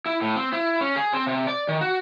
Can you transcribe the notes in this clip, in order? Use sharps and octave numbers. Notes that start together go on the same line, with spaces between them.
E4
A2
C4
E4
C#4
G#4
C4
C3
D5
D#3
F#4